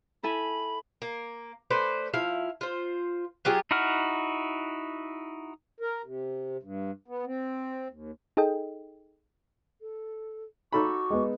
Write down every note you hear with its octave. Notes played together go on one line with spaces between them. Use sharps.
E4 A4 G#5 B5
A#3
A3 B4 C5 D5
F3 E4 F5
F4 C5
F#3 F4 G4 G#4
D#4 E4 F#4 F#5 F6
A#4
C3
G2
B3
C4
D#2
D#4 G#4 A4 D#5 G5
A4
D#4 F#4 A4 B5 C#6 D6
G#3 B3